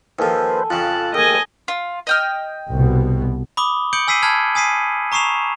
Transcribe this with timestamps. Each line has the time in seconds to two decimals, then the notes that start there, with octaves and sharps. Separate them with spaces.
0.19 D#2 F3 A4 B4 C5 G5 G#5
0.70 F2 C#3 F4 A5 F#6
1.14 D#2 G#4 D#5 G5 G#5
1.68 F4
2.07 D#5 G5 F6
2.70 C2 B2
3.57 B5 D6 D#6 G7
3.93 D#6 G6 C#7 D7 F#7 G7
4.08 G#5 E6 B6 C7 D#7
4.22 A5 B5 E6 F6 G#6
4.55 G#5 D#6 B6 C7 D#7
5.12 A#5 C#6 D#6 C7 E7 F7